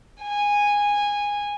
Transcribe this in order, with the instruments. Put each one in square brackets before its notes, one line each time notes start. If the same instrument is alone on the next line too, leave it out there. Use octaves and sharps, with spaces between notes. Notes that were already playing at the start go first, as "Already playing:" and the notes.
[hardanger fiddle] G#5